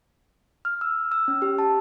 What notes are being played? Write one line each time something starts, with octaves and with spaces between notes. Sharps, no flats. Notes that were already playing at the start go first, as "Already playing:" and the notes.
F6
E6
E6
C#4
G4
A5